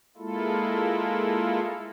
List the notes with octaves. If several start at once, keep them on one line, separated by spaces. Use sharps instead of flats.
G#3 A#3 E4 F4 A4